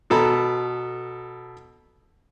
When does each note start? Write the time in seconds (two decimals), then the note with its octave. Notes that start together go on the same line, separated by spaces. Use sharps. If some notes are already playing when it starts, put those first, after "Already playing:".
0.10 B2 A4 A#5 B5